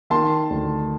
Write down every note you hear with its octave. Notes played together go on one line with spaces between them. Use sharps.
D#3 A5 C6
D2